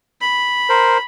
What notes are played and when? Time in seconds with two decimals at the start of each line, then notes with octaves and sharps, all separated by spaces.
0.21 B5
0.69 A#4 C5